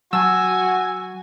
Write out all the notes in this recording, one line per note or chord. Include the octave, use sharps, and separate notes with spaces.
F#3 F#4 G#5 A5 E6